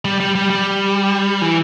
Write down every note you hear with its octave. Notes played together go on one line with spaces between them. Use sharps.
G3
G3
G3
G3
E3